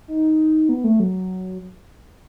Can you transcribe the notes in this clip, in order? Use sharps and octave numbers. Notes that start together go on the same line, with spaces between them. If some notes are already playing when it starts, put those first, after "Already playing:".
D#4
B3
A3
F#3